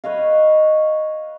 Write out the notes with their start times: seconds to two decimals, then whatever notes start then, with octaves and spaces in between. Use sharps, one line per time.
0.04 B4 C#5 D#5 F5